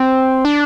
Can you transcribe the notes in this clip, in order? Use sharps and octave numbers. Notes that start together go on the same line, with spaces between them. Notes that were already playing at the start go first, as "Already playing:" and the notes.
Already playing: C4
D4